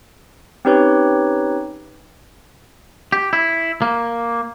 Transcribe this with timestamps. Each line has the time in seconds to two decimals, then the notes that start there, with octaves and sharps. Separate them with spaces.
0.65 C4 C#4 D#4 G4 B4 C#5
3.13 G4
3.33 E4
3.82 A#3